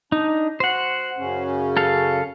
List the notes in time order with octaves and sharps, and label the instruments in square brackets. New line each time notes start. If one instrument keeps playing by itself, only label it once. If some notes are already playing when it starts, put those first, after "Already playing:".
[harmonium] D4 [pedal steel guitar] D#4
[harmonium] F#4 [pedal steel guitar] C5 F#5
[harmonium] F#2 C#3 C#4
[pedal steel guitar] A4 F5